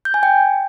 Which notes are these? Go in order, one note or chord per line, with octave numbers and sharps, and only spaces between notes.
G6
G#5
G5